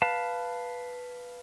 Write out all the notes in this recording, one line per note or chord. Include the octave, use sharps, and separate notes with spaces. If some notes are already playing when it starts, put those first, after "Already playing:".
B4 F5 A5